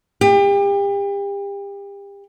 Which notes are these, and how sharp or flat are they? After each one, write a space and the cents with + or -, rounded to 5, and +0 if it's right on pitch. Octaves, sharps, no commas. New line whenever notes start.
G4 +35